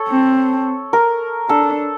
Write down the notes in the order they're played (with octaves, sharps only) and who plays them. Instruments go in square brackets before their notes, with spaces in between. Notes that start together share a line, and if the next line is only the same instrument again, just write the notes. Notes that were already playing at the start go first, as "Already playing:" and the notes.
Already playing: [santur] A4 C#5
[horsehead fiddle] C4
[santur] A#4
[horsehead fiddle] D4 [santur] A4